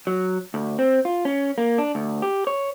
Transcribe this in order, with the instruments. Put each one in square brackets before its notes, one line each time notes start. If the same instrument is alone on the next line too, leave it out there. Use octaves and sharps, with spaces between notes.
[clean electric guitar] F#3
D2
C4
F4
C#4
A#3
D4
D2
G4
C#5